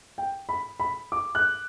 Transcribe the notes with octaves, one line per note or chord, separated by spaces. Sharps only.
G5
B5
B5
D6
F#6